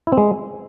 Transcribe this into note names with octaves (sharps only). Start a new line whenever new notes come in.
E4
C4
G#3